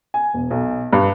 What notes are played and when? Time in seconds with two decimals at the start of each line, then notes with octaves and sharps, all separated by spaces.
0.14 G#5
0.34 E1
0.50 B1
0.93 G2